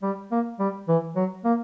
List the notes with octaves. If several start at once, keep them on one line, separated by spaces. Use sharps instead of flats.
G3
A#3
G3
E3
F#3
A#3